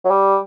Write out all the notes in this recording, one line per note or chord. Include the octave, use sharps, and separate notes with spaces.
F#3
G3